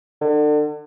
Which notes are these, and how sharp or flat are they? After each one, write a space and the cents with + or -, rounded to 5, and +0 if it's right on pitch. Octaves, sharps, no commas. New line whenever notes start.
D3 +35